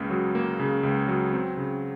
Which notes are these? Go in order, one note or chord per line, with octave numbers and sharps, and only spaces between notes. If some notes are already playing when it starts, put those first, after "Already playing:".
Already playing: C#2 C#3 A#3
F#3
A#3
C#3
C#2
F#3
C4
C#3